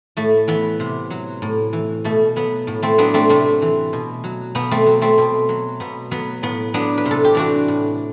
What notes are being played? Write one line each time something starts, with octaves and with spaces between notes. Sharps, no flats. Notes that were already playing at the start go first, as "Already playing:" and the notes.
A2 A3
E3 B3
C3
F#3
A2
E3
B2 A3
F#3 B3
A2
A3 C4
F#3 B3 D4
A3 C4
C3 A3
E3
B2
F#3
B2 B3
A3 C4
F#3
A3 C4
B2
F#3
B2 B3
F#3 B3
A2 B3
F#3 B3 D4
B4
C3
A4
G4
E3 D4 F#4
A2